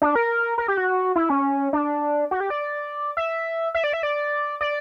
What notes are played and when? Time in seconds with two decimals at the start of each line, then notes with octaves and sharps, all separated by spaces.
0.02 D4
0.16 A#4
0.58 A#4
0.68 G4
0.78 F#4
1.16 E4
1.30 C#4
1.73 D4
2.31 F#4
2.40 G4
2.50 D5
3.17 E5
3.75 E5
3.84 D5
3.93 E5
4.03 D5
4.61 D5